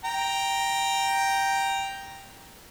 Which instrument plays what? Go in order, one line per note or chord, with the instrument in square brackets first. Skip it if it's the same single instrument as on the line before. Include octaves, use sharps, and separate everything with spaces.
[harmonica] G5 A#5